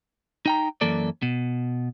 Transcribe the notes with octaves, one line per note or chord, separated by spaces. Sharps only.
D#4 G5 A#5
F#2 E3 A#3 A4 D5
B2